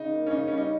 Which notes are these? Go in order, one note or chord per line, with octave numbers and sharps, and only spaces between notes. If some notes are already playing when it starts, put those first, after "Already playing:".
Already playing: C#3 D#4
A#3
C#4
C#3 D#4
G3 C#4
D#4